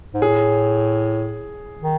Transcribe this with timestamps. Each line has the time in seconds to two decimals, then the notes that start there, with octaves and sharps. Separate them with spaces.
0.14 G#2
0.22 A2 G#4
1.81 D#3